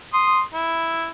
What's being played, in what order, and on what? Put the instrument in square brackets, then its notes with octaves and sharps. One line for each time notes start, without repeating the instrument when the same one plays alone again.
[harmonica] C6 D#6
E4